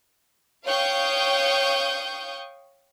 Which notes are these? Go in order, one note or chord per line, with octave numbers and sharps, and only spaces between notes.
C#5 F5 G5 C#6 D#6 G6